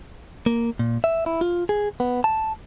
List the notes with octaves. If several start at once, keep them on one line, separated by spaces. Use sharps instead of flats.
A#3
A#2
E5
E4
F4
G#4
B3
A5